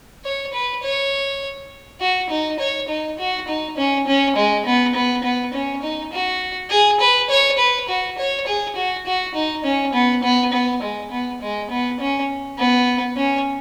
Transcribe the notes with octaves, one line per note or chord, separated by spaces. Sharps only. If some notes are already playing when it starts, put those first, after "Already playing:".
C#5
B4
C#5
F#4
D#4
C#5
D#4
F#4
D#4
C#4
C#4
G#3
B3
B3
B3
C#4
D#4
F#4
G#4
B4
C#5
B4
F#4
C#5
G#4
F#4
F#4
D#4
C#4
B3
B3
B3
G#3
B3
G#3
B3
C#4
B3
C#4